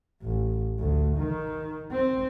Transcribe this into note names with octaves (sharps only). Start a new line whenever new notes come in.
A1
D2
D#3
C4